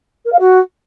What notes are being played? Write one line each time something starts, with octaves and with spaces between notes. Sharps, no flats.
A#4
F5
F#4